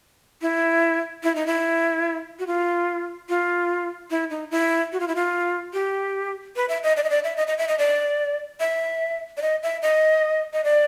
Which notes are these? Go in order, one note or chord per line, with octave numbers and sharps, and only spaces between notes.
E4
E4
D#4
E4
F#4
F4
F4
E4
D#4
E4
F#4
F4
E4
F4
G4
B4
E5
D#5
D5
D#5
D5
E5
D#5
D#5
E5
D#5
D5
E5
D5
D#5
E5
D#5
D#5
D5